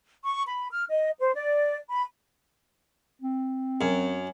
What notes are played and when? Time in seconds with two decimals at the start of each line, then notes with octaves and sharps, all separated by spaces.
0.24 C#6
0.47 B5
0.71 F6
0.89 D#5
1.19 C5
1.34 D5
1.88 B5
3.22 C4
3.81 F#2